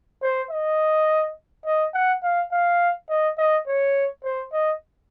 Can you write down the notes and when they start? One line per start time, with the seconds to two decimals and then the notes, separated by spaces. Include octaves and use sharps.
0.22 C5
0.51 D#5
1.66 D#5
1.94 F#5
2.23 F5
2.52 F5
3.09 D#5
3.38 D#5
3.67 C#5
4.24 C5
4.52 D#5